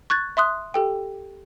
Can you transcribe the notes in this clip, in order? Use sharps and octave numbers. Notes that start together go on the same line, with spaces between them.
C#6 F#6 G#6 A6
E5 C6 D#6 F#6
G4 A4 G5